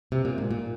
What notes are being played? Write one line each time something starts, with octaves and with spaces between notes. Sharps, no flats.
C3
A#2
G#2
A#2